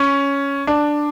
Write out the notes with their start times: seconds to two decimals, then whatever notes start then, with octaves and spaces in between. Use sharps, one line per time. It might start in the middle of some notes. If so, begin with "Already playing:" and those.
Already playing: C#4
0.67 D4